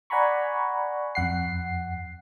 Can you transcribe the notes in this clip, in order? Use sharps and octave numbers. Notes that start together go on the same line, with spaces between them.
D5 F#5 G#5 A#5 B5 C#6
F2 F#5 C7